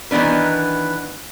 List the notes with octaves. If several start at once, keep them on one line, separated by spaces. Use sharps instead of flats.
D#3 E3 B3 D4 B4